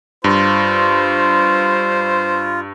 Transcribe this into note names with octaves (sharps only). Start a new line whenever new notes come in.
G2 F4 C5